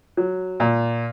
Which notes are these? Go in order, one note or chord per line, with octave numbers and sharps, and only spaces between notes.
F#3
A#2